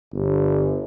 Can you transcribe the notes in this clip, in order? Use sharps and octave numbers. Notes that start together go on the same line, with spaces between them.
G1